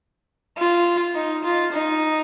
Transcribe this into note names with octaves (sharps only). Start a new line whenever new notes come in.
F4
D#4
F4
D#4